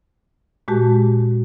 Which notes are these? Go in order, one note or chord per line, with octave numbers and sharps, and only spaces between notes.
A#2 G#3 F#4 G4 A5